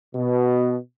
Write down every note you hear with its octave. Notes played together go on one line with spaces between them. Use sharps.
B2